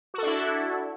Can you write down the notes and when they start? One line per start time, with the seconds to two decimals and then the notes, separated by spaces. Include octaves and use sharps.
0.14 F#4
0.18 A4
0.23 D4
0.27 E4